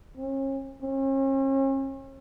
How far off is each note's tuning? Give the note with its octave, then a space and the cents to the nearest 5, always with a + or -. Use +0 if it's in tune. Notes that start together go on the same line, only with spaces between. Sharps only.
C#4 -40
C#4 -45